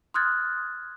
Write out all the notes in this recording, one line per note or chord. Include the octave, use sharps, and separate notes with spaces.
C6 D#6 F6 F#6 G#6 A6